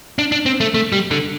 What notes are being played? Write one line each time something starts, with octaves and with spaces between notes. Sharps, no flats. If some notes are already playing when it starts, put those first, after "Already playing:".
D4
D4
C4
A3
A3
G3
D3